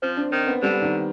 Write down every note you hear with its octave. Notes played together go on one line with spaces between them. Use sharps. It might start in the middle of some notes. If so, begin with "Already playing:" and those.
F3 C4
D4
D#3 C4
B3
D3 G3
D#3